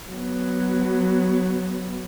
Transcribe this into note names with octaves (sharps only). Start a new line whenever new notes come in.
F#3 B3